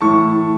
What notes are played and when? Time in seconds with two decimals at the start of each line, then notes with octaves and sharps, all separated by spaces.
0.01 A2 E3 A3 A5 C#6